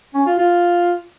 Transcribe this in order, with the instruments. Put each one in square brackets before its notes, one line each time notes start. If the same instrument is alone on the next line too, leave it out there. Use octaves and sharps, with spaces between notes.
[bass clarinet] C#4
F4
F4